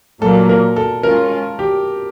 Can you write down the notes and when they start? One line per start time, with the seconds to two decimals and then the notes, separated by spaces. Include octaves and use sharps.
0.22 A#2 F#3 A#3 A4
0.49 A#4
0.76 A4
1.03 G#3 C#4 F4 A#4
1.59 G4